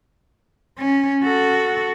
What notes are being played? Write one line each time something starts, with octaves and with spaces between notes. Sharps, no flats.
C#4
F#4 A4